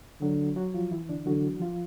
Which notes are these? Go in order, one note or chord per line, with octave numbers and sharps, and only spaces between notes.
D3 F#3 F#4
F#3 F#4
F3 F4
E3 E4
D3 D4
D3 F#3 F#4
F3 F4